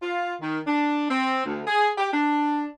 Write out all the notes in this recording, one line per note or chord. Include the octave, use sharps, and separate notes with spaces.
F4
D#3
D4
C4
D2
G#4
G4
D4